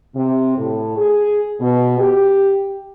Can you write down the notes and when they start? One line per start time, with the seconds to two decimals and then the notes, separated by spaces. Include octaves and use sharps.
0.15 C3
0.57 A2
0.97 G#4
1.60 B2
1.98 G4